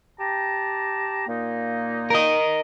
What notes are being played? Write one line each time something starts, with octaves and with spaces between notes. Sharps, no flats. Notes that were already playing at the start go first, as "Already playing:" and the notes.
G4 A5 A#5
A#2 A#3 D#4
A#4 D#5